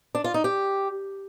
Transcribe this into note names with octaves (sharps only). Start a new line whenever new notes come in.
D4
F4
D#4
G4